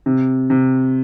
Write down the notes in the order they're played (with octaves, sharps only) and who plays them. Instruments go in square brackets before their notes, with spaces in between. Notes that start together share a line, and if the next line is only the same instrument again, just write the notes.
[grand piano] C3
C3